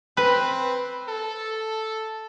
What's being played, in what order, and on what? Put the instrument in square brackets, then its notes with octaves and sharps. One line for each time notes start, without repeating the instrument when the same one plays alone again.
[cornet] C4 [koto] B4
[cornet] A4